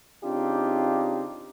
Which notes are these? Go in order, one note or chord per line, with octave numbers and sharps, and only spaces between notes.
C#3 C4 D4 D#4 F4 G4